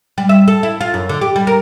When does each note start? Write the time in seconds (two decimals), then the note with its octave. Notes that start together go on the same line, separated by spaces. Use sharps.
0.18 G3
0.29 E5
0.48 A4
0.63 E4
0.81 F4
0.94 F#2
1.09 D3
1.21 G4
1.36 G3
1.47 A#4